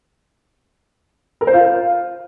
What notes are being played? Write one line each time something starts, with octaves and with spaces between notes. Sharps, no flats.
A#4
C5
F4